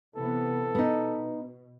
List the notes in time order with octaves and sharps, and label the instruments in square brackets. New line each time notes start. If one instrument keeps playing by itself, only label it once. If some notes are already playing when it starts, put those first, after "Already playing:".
[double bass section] C3 E3 B3 [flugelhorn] A4
[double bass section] B2 [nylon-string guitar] B3 D#4